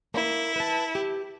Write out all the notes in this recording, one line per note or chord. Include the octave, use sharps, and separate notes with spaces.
A#3 E4
B4 A5
G4